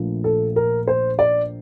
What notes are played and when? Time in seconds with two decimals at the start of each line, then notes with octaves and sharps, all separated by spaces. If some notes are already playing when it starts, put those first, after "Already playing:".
Already playing: A#1 A#2 F3 A3
0.24 A4
0.56 A#4
0.87 C5
1.19 D5